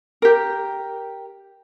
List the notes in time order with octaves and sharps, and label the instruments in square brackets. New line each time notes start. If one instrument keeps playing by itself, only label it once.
[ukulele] G4 A#4